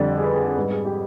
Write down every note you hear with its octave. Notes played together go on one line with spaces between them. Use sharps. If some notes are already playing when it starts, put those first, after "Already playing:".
Already playing: F2 D3 G3 D5
G#4
B4
G#4
G#4
G#2 G3 B4
G#4
G4